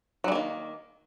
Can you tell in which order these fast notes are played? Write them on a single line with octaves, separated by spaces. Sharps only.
F#3 G3 A#3 D#3